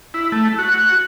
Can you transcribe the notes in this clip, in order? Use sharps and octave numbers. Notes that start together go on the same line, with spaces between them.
E4
A3
F#4